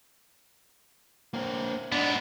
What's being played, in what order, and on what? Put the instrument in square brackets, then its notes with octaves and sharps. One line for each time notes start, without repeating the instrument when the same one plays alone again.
[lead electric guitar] A#3 C4
[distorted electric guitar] G#2 B3 [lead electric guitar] D4